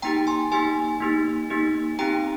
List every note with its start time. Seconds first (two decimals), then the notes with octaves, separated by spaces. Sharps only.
0.02 A#3 D#4 G4 G5 A#5
0.27 G#5 C6
0.52 A#3 D#4 G4 G#5 C6
1.00 A#3 D#4 G4
1.50 A#3 D#4 G4
1.99 C4 D#4 G4 G5 A#5